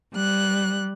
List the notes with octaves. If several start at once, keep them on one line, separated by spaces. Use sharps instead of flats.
G3 F#6